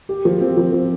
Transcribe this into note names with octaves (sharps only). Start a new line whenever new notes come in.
G4
F3
C4
F3
C4